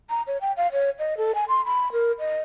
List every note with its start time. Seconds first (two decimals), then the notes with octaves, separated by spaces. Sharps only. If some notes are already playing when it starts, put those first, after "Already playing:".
0.10 A#5
0.27 C#5
0.41 G5
0.57 F5
0.72 C#5
0.99 D#5
1.17 A4
1.35 G#5
1.49 C6
1.65 B5
1.92 A#4
2.19 D#5